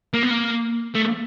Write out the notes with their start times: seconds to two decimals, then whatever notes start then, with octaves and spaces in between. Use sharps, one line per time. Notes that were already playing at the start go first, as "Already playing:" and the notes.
0.14 A#3
0.23 B3
0.31 A#3
0.95 A3